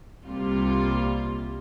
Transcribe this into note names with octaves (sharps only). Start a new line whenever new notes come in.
C2 C3 G3 A#3 F4